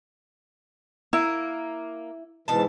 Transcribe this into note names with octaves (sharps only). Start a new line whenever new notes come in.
A#3 E4
G#2 B2 E3 A5